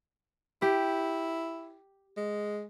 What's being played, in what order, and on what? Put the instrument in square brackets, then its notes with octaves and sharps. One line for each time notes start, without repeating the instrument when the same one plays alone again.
[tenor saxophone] E4 [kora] G4
[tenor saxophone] G#3